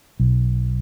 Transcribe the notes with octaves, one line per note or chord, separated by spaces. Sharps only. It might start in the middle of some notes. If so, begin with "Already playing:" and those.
B1